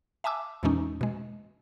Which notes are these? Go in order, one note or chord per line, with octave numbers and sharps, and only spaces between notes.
E5 G#5 A5 D6 E6
E2 A#2 E3 G#3 C#4 D#4
B2 G#3